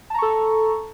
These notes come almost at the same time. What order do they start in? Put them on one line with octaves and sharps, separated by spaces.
A5 A#5 C#6 A4